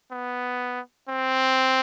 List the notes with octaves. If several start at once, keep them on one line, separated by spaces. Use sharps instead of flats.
B3
C4